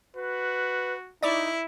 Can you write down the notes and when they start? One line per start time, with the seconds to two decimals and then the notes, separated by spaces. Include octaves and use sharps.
0.17 F#4 B4
1.23 D#4 E4 D5 C#6 D6